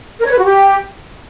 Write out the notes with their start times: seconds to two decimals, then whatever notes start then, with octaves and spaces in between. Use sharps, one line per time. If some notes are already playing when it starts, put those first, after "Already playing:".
0.19 A#4
0.26 C#5
0.32 B4
0.38 F#4
0.44 G4